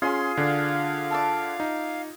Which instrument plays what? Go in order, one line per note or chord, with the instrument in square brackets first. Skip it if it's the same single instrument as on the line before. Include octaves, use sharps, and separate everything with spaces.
[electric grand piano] C#4 [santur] F4 G#4 [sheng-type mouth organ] C6
[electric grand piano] D3 D4 [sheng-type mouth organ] F5
[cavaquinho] D5 E5 A5
[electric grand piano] D#4